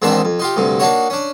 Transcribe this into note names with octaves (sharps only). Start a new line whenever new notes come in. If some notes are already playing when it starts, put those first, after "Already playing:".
E2 G#2 D#3 C4 D4 E5
F2
D#4 F4 G4
D2 G2 C3
A#3 D4 D#4 F#4 C#5
C#4 D4